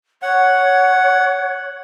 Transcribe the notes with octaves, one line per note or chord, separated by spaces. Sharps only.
C#5 F#5